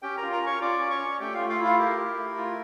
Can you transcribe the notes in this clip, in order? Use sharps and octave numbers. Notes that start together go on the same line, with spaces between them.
C#4 G4 G5
F4 A#4 A#5
A#4 A#5
C#4 C#5 C#6
F4 D5 D6
C#4
C#5 C#6
C#4
A3 G4 G5
A3 F4 F5
F4 F5
E4
F4 F5
G4 A#4
E4
A3
F4